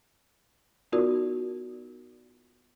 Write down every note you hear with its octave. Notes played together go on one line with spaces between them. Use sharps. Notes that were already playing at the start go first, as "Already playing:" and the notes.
B3 D#4 F4 F#4 A#4 D5